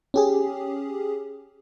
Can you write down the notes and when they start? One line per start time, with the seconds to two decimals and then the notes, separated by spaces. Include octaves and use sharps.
0.14 C#4 G4 G#4